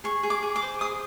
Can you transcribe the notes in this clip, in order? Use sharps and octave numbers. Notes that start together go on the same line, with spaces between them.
G#4 C#6
G#4
D6
G#4
D6
C5
G#4 D#6